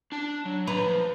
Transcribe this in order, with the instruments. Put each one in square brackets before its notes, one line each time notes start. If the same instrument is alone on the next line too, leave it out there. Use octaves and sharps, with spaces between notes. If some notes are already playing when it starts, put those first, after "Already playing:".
[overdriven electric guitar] D4 A5
F#3
[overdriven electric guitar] D#2 A#5 [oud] B4
[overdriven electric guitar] F3